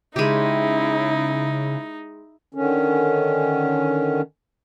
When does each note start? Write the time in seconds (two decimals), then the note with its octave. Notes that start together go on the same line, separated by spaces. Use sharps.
0.16 C#3 G#3 D#4 E4 G4
2.54 D3 D#3 C#4